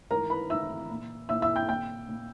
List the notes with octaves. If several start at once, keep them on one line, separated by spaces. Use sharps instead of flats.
G#2 E3 A#4 A#5
B4 B5
G#2 E3 E5 E6
A#2
A#2 E5 E6
E5 E6
G5 G6
A#2 G5 G6
A#2